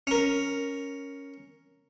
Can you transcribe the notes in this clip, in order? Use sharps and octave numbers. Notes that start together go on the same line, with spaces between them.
C#4 A#4